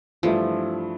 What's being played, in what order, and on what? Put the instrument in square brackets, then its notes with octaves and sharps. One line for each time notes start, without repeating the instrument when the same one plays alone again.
[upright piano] G2 E3 A3 E4 [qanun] F3